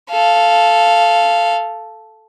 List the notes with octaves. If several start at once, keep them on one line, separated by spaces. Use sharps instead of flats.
A4 F5